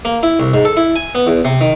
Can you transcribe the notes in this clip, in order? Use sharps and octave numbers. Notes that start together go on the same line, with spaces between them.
A#3
E4
C2
G#2
A4
E4
G#5
B3
E2
C3
D#3